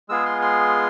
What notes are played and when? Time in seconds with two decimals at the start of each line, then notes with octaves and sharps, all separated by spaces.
0.09 G#3 B3 F4 G#4 E6
0.26 C6
0.42 C6